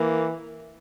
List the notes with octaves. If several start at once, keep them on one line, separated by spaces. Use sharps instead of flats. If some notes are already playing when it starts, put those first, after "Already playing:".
Already playing: E3 A#3